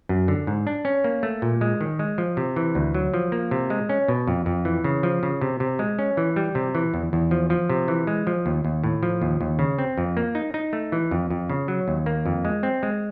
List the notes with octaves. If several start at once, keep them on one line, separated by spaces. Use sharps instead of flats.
F#2
D3
G#2
D4
C#4
A#3
A3
A#2
G#3
D#3
G#3
F3
C3
E3
D2
F#3
F3
A#3
C3
G#3
C#4
B2
F2
F2
E3
C#3
F3
C#3
C3
C3
G#3
C#4
E3
G3
C3
E3
E2
E2
F3
F3
C3
E3
G#3
F3
D#2
D#2
A2
F3
D#2
D#2
C#3
C4
F2
A#3
D#4
D#4
A3
E3
F2
F2
C#3
F#3
D#2
A#3
F2
G#3
C4
G#3